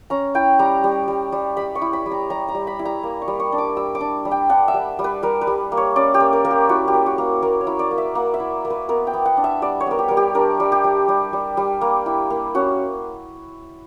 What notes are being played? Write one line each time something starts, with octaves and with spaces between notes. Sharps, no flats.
C#4 A#5
E4 G5
G3 A#5
G3
G3
G3
G3 B5
C#6
E4
B5
G3
A#5
G3 A#5
A#5
G3
B5
E4
A#5
A#3
C#6
G3
C#6
D4
D6
G3 E6
D6
D4
G3
G5
D4 F#5
E5
G3
G3
B4
G3 A#4
B4
G3
A#3
C#5
C#4 D5
G4
A#3
A#4
A#3 A#4
G4
E4 F#4
G4
A#3
F#4
A#3
A#3 A#4
C#5
E4
D5
A#3
E5
A#3 F#5
E5
E4
A#3
B4
B3 A#4
G5
B3
F#5
D4
E5
G3 D5
C#5
B3 A#4
G4
G3 A#4
G4
D4 A#4
G3
G4
G3
G3
G3
G3
A#3
E4
A#3
C#4 F#4